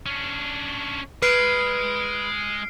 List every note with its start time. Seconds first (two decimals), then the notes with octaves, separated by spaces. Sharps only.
0.06 C#4 D4
1.22 G#3 B4 F6 C7 D7